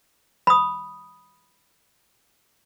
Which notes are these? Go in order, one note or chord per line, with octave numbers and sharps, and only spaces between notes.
B5 D#6